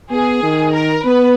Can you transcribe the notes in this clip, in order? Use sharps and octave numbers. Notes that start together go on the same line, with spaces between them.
B3 G#4
D#3
A#4
B3 B4